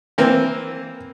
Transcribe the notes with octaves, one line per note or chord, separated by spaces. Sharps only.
E3 A#3 C4